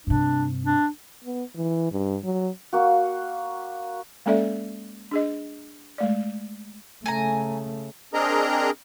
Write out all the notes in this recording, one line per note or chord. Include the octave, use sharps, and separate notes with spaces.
G2 C3 D4
D4
B3
E3
G2
F#3
A#3 F#4
G#3 A#3 C#4 A4 D5 E5
D4 G#4 D#5
G#3 A3 D5
C#3 A3 G#5 A#5
C4 D4 G#4 A#4 D#5 A#5